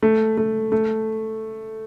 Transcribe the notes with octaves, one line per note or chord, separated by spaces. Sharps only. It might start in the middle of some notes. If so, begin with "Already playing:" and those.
A3
A3
A3